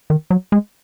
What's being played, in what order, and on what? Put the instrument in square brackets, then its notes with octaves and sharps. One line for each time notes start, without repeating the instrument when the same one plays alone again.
[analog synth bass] D#3
F#3
G#3